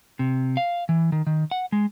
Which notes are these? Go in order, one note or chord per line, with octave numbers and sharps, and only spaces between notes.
C3
F5
E3
D#3
D#3
F#5
G#3